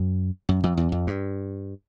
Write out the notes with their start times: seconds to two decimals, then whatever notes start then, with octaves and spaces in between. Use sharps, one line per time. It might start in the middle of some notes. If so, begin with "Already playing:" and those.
Already playing: F#2
0.49 F#2
0.64 F2
0.77 E2
0.92 F2
1.07 G2